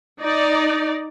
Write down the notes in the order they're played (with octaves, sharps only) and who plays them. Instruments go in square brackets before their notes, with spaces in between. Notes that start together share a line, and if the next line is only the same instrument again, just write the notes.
[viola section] D#4 D5